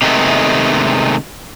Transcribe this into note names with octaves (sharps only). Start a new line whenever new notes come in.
C3 D#3 G#3 A3 B3